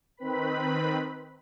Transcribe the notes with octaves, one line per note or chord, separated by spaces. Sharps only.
D#3 C4 B4 B5